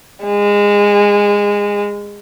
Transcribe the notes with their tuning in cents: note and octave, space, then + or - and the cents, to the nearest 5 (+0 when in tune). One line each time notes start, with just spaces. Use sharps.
G#3 -20